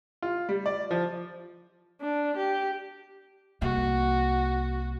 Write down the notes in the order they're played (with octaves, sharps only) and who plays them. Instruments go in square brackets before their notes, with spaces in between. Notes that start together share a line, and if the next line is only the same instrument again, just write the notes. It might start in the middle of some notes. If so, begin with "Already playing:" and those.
[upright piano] F4
G3
D5
F3
[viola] D4
G4
[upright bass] C2 A#3 [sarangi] F#4